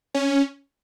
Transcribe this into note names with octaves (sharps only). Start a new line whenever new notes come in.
C#4